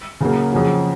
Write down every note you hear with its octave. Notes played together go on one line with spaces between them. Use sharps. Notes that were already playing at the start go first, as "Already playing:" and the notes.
C#3 F#3 A#3
F2 C#3 F#3